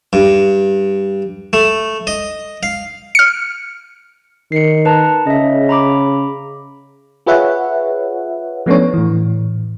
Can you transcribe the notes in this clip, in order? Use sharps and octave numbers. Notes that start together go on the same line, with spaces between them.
G2
A3
D#5
F5
F6 C#7
D#3 C7 C#7
B4 A5 A#5
C#3 D#5 E5
A#5 B5 D6
F4 G#4 B4 C#5 E5 F#5
F3 A3 B3 C#4 D4 C#5
A2 E3